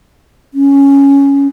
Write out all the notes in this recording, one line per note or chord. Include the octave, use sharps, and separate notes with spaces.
C#4